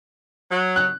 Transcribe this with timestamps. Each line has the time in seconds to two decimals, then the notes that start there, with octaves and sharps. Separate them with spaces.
0.51 F#3
0.76 F#6